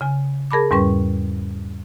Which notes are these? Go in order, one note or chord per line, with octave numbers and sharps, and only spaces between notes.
C#3 G#5
G#4 A#4 A5 B5 D6
E2 G#2 G3 C#4 B4 C#6